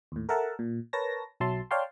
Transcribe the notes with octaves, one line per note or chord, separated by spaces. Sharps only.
D#2 A2
A4 A#4 E5 F#5 A5
A#2
A#4 B4 C#5 A5 A#6
B1 F#3 E5 A5 C6
C#5 D5 F5 G5 A5 C6